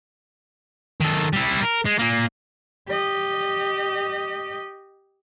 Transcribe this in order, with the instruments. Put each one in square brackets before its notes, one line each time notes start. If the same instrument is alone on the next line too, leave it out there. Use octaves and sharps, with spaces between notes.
[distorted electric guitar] D#3 A4
G3 E4
A#4
G#3
A#2 A#3
[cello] G4 D#5